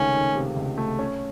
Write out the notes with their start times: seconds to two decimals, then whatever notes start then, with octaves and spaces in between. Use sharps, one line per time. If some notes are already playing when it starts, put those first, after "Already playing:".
Already playing: C#2 C3 D#3 A3 C#4
0.14 D#3
0.35 C3
0.56 C#2
0.78 A3
0.99 C#4